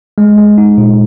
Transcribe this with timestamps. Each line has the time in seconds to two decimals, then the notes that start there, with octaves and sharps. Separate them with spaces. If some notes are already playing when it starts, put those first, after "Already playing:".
0.18 G#3
0.38 G#3
0.58 D#4
0.78 A#2